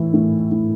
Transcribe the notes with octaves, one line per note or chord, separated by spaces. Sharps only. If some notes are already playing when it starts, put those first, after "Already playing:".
Already playing: A2 E3 E4
A2
A2